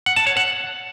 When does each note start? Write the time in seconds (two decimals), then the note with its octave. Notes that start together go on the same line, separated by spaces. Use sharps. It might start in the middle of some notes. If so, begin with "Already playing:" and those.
0.06 F#5
0.16 A5
0.27 C#5
0.37 F#5